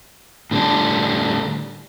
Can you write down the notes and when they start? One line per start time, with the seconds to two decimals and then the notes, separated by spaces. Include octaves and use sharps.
0.51 A2 D3 G3 D4